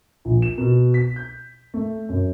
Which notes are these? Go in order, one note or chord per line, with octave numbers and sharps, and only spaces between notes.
A#1
E7
B2
B6
G6
A3
F#2